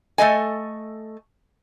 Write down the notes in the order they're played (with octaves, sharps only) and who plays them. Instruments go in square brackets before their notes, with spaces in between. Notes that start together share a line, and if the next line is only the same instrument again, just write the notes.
[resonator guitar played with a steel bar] A3 A4 D#5 G#5